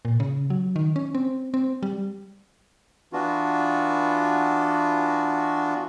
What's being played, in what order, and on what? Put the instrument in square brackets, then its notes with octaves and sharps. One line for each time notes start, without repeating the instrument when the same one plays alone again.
[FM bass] A#2
C#3
F#3
D#3
C#4
C4
C4
G3
[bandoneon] E3 B3 D4 F4 F#4